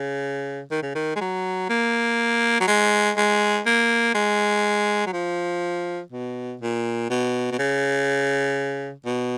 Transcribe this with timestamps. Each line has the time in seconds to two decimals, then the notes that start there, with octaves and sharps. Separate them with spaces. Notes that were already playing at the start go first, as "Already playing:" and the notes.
Already playing: C#3
0.71 D#3
0.82 C#3
0.95 D#3
1.15 G#3
1.21 F#3
1.69 A#3
2.60 F#3
2.67 G#3
3.17 G#3
3.66 A#3
4.14 G#3
5.06 F#3
5.13 F3
6.12 B2
6.61 A#2
7.10 B2
7.51 B2
7.59 C#3
9.05 B2